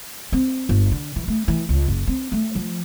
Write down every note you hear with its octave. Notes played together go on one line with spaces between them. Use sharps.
C4
G1
D3
E3
A3
E3
C#2
F#1
C4
A3
F3